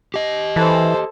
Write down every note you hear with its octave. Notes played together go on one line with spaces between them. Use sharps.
G4 D#5
E3 A4 C5